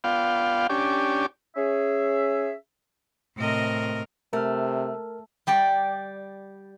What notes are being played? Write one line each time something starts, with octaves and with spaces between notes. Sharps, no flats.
B3 F4 D5 F5 G5
C#4 D4 G4
C#4 G#4 E5
A2 C3 C4 A#4 D#5
C3 A3 A#4 F6
G3 G4 D5